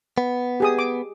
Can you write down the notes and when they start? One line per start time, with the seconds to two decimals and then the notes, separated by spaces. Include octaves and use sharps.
0.18 B3
0.60 G4 G#4 D#6
0.79 D6